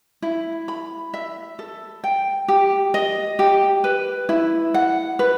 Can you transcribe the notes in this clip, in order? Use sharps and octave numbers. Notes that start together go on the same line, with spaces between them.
E4
B5
E5
A4
G5
G4
D#5
G4
B4
E4
F#5
B4